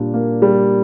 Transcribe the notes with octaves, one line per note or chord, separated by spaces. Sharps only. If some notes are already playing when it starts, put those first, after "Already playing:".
Already playing: A#2 G3 D4
A#3
G3